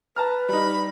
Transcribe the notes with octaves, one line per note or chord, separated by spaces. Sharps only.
B4 A5 A#5 F6
G3 D#4 B5